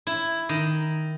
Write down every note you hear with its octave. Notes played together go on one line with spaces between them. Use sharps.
E4
D#3